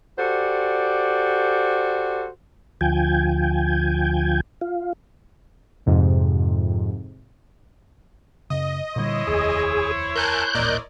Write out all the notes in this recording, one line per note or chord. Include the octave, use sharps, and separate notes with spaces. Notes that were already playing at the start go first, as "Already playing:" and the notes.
F#4 G4 A4 C5 D5
D2 F3 G5 G#5
F4
F2 G#2 C3
F#2 C#3 D#5
A#2 D3 G3 E4 C5 C#5
F1 D#2 G#4
A#4 G#5 A5 F#6 G6
D#1 A1 A#2 A#4 D5 D#5